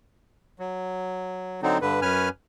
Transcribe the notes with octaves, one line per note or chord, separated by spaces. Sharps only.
F#3
D3 F#3 C4 D#4
G2 D3 B4
F#2 C#4 B4 G#5 F6